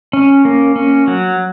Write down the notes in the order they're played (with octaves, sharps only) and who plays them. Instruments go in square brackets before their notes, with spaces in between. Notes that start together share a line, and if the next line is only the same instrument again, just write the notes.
[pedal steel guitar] C#4
A#3
C#4
F#3